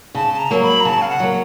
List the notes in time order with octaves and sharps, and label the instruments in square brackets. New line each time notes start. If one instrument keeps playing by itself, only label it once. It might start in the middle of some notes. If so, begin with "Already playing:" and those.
[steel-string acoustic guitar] C#3 [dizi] A5
[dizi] A5
A#5
[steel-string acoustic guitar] F#3 A#3
[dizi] B5
A#5
[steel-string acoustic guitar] C#3 [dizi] A5
[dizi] F5
F#5
[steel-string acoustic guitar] F#3 A#3